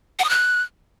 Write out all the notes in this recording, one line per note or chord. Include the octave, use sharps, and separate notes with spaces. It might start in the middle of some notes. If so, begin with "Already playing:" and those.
F#5
D#6
F#6